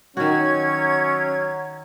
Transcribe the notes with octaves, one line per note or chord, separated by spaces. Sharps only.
D#3 F#3 C#4 F#4 G#6